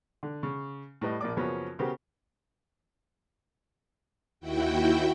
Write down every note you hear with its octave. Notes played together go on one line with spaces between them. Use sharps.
D3
C#3
A2 G3 B4 D#5
A#1 A#3 D5 D6
F#2 C#3 F3 A#3 B3 C#4
C#3 B3 F#4 G4 A#4 C5
D#2 E4 F#4 G5